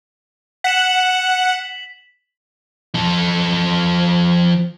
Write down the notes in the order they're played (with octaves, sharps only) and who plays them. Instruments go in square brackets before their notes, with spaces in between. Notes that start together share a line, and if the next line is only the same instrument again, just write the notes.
[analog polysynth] F#5 [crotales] B6 E7 F#7
[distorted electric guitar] F3 A4